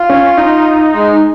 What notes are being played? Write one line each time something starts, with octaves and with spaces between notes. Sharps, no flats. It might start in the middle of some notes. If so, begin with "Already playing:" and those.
Already playing: F4
C#4
D#4
G#3